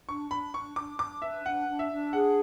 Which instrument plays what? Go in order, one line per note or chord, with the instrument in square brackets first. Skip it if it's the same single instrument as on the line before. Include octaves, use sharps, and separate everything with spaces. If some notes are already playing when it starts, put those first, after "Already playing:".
[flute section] D4 [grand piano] C#6
[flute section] D4 [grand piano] B5
[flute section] D4 [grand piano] C#6
[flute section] D4 [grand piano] D6
[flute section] D4 [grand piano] D6
[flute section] B4 [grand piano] E5
[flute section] D4 [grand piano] F#5
[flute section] D4
[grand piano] E5
[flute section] D4
[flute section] G#4 [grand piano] F#5